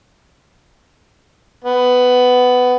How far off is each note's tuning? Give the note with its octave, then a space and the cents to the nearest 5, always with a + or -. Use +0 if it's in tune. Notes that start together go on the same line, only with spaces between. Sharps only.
B3 +15